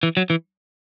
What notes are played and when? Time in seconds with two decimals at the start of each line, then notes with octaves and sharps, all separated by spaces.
0.03 E3
0.17 F#3
0.30 E3